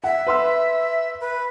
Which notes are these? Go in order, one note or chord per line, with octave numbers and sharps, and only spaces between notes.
E5 F#5
B4 C6 E6
B4